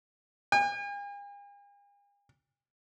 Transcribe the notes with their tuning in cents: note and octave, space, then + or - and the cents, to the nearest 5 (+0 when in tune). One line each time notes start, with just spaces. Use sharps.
G#5 -45